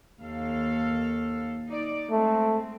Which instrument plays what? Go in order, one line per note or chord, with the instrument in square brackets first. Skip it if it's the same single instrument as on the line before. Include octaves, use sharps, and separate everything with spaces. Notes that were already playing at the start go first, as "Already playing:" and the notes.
[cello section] D#2 A4 F5
D#4 D5
[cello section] G#3 C4 [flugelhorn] A3